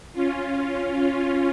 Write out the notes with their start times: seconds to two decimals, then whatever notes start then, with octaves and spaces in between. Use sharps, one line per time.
0.13 C#4 F4
0.99 C#4 F4